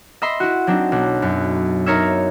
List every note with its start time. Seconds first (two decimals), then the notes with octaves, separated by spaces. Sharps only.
0.22 D#5 E5 B5 C6
0.40 E4 F#4
0.67 F#3 C4 D4 D#4
0.92 B1
1.22 F#2
1.86 D#4 A#4 C#5 E5